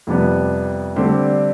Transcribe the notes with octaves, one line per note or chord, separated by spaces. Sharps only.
F2 C3 G3 B3
D3 G3 C4 G4 C5